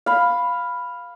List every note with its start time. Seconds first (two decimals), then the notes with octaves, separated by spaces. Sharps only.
0.06 F5 B5